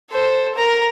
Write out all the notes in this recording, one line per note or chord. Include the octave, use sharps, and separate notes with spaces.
A4 C5
A#4 A#5